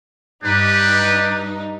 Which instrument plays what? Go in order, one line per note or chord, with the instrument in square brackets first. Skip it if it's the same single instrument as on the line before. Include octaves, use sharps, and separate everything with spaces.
[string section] G2 D#4 [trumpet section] D4 G4 B4